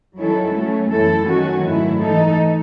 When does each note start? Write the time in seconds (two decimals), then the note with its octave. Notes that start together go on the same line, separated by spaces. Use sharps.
0.18 D#3 F#3 C#4 E4 A4
0.54 F#3 A3 C#4
0.91 F#2 E3 A3 E4 A4
1.28 D#3 F#3 A3 C#4 F#4
1.65 G#2 D#3 F#3 A3 E4
2.02 E3 A3 D#4 A4